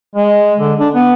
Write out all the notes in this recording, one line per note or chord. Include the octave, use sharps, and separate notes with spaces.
G#3
D3
D4
B3